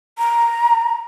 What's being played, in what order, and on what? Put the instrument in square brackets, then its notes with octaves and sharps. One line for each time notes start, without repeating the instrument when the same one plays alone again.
[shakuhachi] A#5